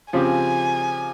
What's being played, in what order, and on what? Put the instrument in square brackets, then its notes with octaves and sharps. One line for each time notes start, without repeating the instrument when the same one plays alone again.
[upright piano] C#3 F3 C4 G4 [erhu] G#5